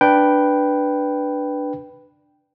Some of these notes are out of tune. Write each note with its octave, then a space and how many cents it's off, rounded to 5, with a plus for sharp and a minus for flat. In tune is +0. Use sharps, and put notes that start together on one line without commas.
D4 +5 B4 +0 G5 -5